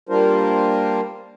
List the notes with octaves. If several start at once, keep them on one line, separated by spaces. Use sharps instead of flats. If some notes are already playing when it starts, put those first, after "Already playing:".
G3 A#3 D4 F4 A#4 C5